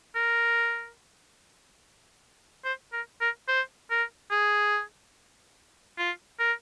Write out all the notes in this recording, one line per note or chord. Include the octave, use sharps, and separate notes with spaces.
A#4
C5
A#4
A#4
C5
A#4
G#4
F4
A#4